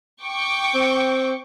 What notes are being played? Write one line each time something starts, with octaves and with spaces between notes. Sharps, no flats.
G5 C#6 D6
C4